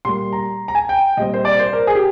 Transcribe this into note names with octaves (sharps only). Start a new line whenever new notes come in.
A#2 G3 A#3 C6
A#5
A#5
G#5
G5
A#2 G3 C4 D#5
C5
D5
C5
A#4
G#4
G4